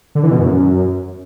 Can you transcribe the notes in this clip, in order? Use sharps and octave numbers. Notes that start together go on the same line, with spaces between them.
D3
E3
B2
F#2